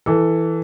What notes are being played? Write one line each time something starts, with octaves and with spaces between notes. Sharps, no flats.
E3 A4